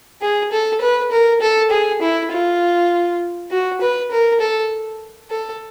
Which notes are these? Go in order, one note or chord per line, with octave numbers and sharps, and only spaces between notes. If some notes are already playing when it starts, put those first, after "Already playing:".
G#4
A4
B4
A#4
A4
G#4
E4
F4
F#4
B4
A#4
A4
A4